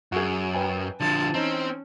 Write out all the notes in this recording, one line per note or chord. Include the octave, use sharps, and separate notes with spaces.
F#2 F#4 G#4
B4 G5 G#5
D3 F3 A5
E3 C4 C#4 D#4